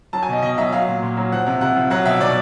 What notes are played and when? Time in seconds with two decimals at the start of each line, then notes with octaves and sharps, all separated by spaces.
0.13 F#3 A5
0.23 G#5
0.29 B2 D#5
0.42 B2 D#5
0.58 F#3 E5
0.72 F#3 F5
0.88 A#2
1.03 A#2
1.17 F#3
1.32 F3 F#5
1.47 C3
1.61 C3 F#5
1.77 F3
1.90 F#3 F#5
2.05 B2 E5
2.21 B2 D5